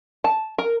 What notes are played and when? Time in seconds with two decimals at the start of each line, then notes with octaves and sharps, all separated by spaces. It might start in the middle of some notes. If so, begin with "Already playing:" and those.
0.24 A5
0.58 A#4